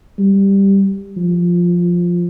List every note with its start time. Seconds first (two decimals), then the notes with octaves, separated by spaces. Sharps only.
0.19 G3
1.17 F3